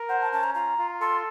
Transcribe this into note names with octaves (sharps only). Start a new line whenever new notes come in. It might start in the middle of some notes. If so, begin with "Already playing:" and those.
Already playing: A#4
C5 F#5
A5
C#4 A5
A#5
F4 A#5
F4
A4 C6